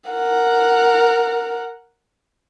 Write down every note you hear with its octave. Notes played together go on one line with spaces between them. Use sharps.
A#4 F#5